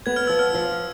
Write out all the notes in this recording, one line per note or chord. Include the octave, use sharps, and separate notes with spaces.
B3 G#6
F6
F3 E6
F6
F3